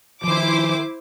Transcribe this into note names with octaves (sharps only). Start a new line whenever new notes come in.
D#3 F3 E4 C5 D6